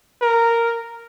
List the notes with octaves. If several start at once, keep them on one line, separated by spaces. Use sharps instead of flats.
A#4